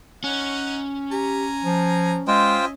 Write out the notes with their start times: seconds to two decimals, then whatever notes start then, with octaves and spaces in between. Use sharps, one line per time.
0.24 C#4 D#4 F#5
1.12 G4 G#5 A#5
1.65 F3
2.28 G#3 F4 C5 D#5 E5 G5 G#5